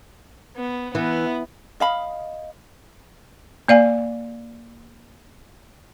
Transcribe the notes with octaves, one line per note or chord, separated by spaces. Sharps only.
B3
E3 B3
D#5 F5 B5
A#3 D5 F5 G#5